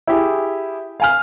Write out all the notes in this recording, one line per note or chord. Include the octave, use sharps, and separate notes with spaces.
E4 G4 G#4
F5 G#5 F6